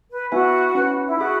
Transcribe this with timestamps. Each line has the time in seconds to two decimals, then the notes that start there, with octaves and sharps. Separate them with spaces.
0.10 B4
0.32 B3 E4 F#4 B4 E5 G#5
0.75 C#4 E4 B4 F#5
1.06 E4
1.19 E4 F#4 G#4 E5